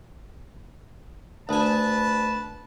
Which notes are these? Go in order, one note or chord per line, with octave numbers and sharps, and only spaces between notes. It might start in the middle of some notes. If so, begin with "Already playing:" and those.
D2 B4 G#5 A5